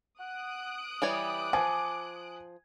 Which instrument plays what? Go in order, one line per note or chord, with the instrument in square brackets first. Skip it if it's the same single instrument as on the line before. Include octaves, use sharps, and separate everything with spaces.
[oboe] F#5 [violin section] D#6 F#6 D7
[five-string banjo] E3 G3 C#5 [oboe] D6
[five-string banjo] F3 [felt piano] G#5